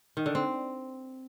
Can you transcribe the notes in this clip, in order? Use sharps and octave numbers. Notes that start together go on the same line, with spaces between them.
D#3
D3
C4